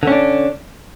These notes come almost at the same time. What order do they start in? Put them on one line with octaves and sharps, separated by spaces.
D3 C#4 D4